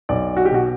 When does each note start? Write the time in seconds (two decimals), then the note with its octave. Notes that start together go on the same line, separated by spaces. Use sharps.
0.09 B1 D5
0.37 F#4
0.45 G4
0.51 B2 F#4